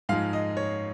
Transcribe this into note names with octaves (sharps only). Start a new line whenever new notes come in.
G#2 F3 G#3 F5
D#5
C#5